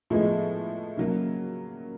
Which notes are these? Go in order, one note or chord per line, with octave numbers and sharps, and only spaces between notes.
A2 F3 G#3 B3
C#3 F#3 A#3